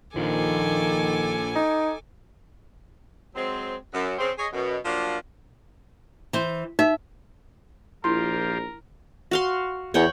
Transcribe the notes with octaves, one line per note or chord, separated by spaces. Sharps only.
A#1 D#3 F3 A4 G#5 D6
D#4
F#3 G#3 C4
F#2
C#3 C4
G#4 C#5 D#5
F#2 B2
F3 F#3 A#3 D4
E3 C5
D#4 E5
A#1 F3 E4 F4 G4 A#4 C6
F#4 F5 C6
E2 C#5 F#5 G5